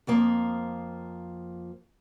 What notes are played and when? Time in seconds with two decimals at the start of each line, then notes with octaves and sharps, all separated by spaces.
0.07 F2 F3 A#3 A#5